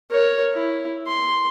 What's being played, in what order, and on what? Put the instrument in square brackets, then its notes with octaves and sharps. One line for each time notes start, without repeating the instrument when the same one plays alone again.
[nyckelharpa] A#4 C#5
E4
C6